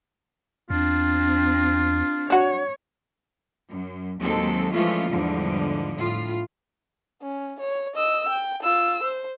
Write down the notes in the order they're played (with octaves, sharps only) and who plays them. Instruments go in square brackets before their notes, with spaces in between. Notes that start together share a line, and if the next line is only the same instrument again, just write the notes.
[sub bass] E2 [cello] C4 D4 [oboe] F4
[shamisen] D4 F#4 [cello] C#5
[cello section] F#2
D#2 F#3 G#3 C4 A4
E3 F3 G#3 A3 C#4 F4
E2 G#2 D3 F3 G3
A2 F4
[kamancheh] C#4
C#5
D#5 E6
G5
F4 E6
C5